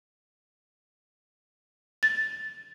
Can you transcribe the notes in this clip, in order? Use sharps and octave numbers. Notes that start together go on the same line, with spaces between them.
A6